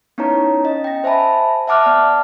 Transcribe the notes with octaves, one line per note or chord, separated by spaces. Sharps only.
B3 C#4 D#4 E4 C#5 A#5
C#4 D#5
G5 A#6
C5 E5 G#5 A5 B5
E5 F#5 A5 D6 F6 F#6
B3 D5 F#5 A5 F6